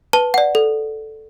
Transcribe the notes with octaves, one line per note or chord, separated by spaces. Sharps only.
B4 A5
D5 F#5
A4